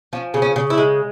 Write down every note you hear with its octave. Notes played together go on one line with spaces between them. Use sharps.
F3 C#4
C#3
C#4
C#3
E4
G#3